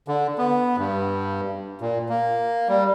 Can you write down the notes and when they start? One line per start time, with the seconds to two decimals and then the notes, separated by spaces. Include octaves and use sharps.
0.08 D3
0.38 B3
0.78 G2
1.81 A#2
2.09 A#3
2.68 G3